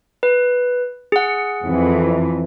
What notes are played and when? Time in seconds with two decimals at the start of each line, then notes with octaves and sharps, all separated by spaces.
0.23 B4
1.12 G#4 F#5
1.66 F2 E3